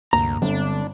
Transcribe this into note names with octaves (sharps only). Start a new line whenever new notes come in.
D2 G2 C3 A#3 A#5
G1 D3 G#3 C4 D4